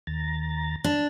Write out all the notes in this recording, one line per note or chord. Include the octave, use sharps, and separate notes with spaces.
D#2 A#5 A6
D4